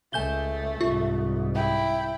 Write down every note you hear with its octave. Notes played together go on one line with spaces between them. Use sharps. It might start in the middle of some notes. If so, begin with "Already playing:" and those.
C#2 A3 G#5 G6 G7
C2 G#2 F4
E4 G5